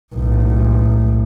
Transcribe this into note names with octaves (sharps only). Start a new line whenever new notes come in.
B1 A2